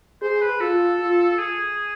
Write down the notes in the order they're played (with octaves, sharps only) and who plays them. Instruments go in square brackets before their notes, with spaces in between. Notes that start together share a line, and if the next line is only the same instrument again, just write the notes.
[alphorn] G#4 [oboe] C5
[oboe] B4
[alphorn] F4 [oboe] A4
[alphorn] F4
[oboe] G#4